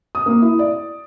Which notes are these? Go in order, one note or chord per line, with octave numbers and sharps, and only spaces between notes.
D#6
A#3
E4
D5